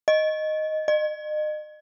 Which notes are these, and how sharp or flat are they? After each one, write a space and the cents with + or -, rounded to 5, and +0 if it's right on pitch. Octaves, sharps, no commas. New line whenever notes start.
D#5 +0
D#5 -35